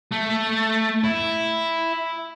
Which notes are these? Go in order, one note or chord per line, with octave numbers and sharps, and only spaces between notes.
A3
E4